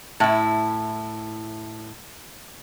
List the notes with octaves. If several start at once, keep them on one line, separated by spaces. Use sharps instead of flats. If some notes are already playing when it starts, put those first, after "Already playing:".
A2 E4